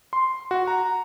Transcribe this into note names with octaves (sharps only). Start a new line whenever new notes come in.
C6
F#4
A#5